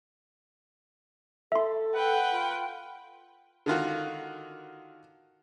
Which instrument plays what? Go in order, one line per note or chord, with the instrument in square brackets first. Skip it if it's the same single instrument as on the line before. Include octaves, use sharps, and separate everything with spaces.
[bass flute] A4 [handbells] E5 C6
[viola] B4 G5 [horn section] F#5
[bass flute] F4
[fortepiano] D3 D#3 F4 F#4